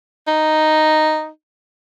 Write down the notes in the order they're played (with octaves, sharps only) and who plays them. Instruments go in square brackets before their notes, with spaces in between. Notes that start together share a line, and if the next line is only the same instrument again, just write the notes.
[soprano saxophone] D#4